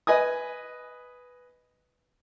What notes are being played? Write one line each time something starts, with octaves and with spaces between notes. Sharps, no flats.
B4 D#5 G#5 D#6